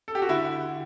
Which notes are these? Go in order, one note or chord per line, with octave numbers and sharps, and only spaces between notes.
A4
G4
F#4
D3 E4